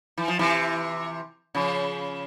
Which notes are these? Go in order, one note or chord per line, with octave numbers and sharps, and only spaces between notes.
E3
F3
C3 E3
C#3 F3